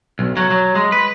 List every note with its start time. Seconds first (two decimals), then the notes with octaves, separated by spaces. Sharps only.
0.19 B1
0.37 F#3
0.50 F#3
0.75 G#3
0.92 B4